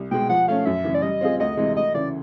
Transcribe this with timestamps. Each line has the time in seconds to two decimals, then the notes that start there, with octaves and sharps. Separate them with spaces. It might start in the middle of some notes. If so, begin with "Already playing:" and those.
Already playing: C2
0.11 B2 G#3 G5
0.29 F3 F#5
0.48 A3 C#4 F5
0.65 F#2 E5
0.84 C#3 E3
0.94 D5
1.02 G3 D#5
1.21 C4 F4 G#4
1.40 D2 D#5
1.57 C3 E3 G#3
1.76 D2 D#5
1.94 C#3 E3 D5